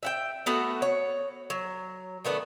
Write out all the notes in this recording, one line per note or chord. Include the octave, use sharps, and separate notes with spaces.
E5 F#5 G5
A3 B3 F#4 F#5
C#5
F#3
D#3 A3 B3 D4